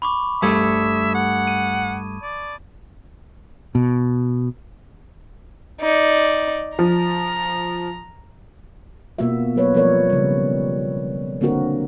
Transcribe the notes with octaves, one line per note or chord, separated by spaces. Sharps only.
B5 C#6 D6
G2 G3 A3 E5 A5 D#6 G#6
F#5
D#7
D5
B2
D#4 D5
F3 A#5
B2 A#3 B3 F4 F#4 E5
F#3 B4 C#5
F3 G3 C4 A#4 C#5 D5
C#3 G3
D3 A#3 C4 F#4 A#4